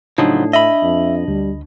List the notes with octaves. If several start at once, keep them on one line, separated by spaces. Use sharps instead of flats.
A2 C#3 F3 F#3 D4 D#4
D#5 E5 B5
F2
D2 G3